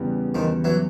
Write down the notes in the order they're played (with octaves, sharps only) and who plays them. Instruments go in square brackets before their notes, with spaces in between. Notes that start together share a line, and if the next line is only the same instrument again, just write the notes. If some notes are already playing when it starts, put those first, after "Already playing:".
Already playing: [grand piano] E2 C#3 E3 G3 B3
[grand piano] E2 [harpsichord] D#3 F3
[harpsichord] E3 F#3